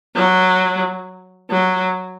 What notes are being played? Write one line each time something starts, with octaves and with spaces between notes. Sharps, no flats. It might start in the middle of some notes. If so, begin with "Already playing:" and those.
F#3
F#3